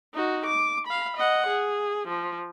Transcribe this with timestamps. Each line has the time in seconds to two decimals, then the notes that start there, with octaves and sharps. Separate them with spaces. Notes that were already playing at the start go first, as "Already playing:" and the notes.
0.13 D#4 F#4
0.46 D6
0.87 F5 B5
1.17 D#5 F#5
1.47 G#4
2.08 F3